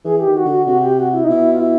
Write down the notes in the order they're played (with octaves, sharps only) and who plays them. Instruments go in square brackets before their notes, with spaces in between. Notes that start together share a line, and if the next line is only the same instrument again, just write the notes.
[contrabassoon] E3 [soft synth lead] G#4
[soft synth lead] G4
[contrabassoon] D#3
[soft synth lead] F#4
[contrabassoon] D3
[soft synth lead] F#4
[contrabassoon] C3 [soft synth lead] F#4
[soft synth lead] G4
F#4
E4
D#4
[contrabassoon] B2 [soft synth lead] E4
[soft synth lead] F4
E4